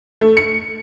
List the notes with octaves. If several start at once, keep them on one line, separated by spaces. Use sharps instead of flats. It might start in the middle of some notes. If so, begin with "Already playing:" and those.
A3
C#7